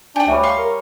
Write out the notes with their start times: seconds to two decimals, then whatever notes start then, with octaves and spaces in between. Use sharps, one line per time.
0.16 D4 G4 F#5 G#5
0.28 D2 G3 C#5 E5 G#5 D#7
0.43 F5 C6 C#6
0.58 A#4